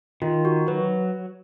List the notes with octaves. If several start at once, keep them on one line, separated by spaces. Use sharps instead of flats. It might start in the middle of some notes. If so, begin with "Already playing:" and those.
D#3 F4
F#4
F#3 B4